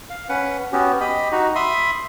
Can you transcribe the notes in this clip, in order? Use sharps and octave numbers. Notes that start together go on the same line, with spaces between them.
F5
C#4 B4 F#5
B3 C#4 F#4 G4
G4 D#5 B5
D#4 F#4
E5 B5 C6 D#6